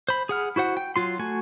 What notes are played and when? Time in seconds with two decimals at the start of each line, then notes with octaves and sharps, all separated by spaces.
0.08 C5 B5
0.29 G#4 F#5 F6
0.56 E4 F#4 C5 F#5
0.77 G5
0.96 F#3 F4 C6
1.19 A3 F#4 G#5